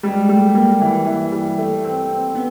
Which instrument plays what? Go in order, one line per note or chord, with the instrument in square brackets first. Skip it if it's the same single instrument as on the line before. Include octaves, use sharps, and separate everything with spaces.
[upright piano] G3 [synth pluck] G#3
[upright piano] G3 [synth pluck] A3
[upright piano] G3 [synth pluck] A#3
[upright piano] E3
E3
G3
A3
C4
C4
[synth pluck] B3